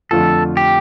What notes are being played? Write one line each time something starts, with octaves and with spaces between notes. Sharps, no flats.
F2 D3 F3 A3 F4 A4
G4